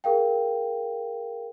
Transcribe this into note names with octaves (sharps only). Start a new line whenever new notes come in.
G#4 A#4 F5 G5